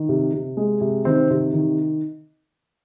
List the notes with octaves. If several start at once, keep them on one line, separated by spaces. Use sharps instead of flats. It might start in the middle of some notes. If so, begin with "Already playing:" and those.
Already playing: D#3
C3
C3
G#3
C3
D#3 C4
C3
D#3